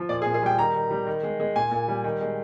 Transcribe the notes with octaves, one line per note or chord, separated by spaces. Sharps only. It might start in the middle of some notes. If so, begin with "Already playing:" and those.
Already playing: F3
A#2 D5
G#4
A#2
G#4
G3 G5
D#3 A#5
D#3
G3
D#3
G#3
G#3
A#2 G#5
A#2
G3
D#3
G#3